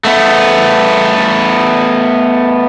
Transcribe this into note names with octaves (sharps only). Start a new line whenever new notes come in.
A3 B3